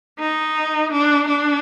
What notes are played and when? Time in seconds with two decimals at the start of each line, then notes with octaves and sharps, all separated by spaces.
0.19 D#4
0.92 D4
1.28 D4